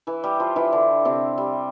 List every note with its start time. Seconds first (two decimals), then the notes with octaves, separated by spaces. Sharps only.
0.07 E3 E4
0.24 G3 G4
0.40 F3 F4
0.56 E3 E4
0.72 D3 D4
1.05 C3 C4
1.38 G3